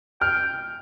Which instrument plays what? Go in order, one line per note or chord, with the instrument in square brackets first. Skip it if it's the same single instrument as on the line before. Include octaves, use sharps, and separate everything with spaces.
[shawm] G5 [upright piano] F6